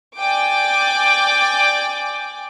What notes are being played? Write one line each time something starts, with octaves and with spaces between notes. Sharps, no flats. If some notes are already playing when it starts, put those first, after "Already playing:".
D5 G5 G#5 D6